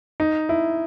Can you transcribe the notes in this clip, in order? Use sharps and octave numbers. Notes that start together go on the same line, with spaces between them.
D#4
E4